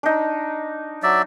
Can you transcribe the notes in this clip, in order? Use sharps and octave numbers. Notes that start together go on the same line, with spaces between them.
D4 D#4
F#3 D5 E5